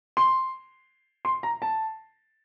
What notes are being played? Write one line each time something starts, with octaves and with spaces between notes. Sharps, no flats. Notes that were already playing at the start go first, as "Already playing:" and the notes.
C6
C6
A#5
A5